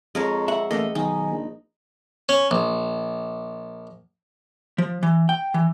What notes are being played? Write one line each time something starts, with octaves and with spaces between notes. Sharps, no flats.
F2 G#3 A#4 C#5
E5 F#5
A1 A3 A#3 A4 D#5
B1 D#3 D#4 G#5
A#1
C#4
A#1
F3
E3
G5
E3